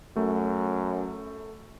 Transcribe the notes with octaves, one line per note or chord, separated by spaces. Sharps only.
F#2 A3